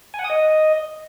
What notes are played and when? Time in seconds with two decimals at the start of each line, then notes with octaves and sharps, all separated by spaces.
0.14 G#5
0.19 F#5
0.24 D#6
0.30 D#5